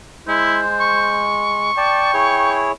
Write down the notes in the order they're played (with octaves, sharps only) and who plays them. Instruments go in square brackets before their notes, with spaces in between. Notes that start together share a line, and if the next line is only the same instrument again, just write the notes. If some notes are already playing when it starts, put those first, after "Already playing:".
[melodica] G#3 [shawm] E4 [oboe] C5
[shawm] C#6
[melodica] D5 A5 [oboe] G5
[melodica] E4 G#4 C#5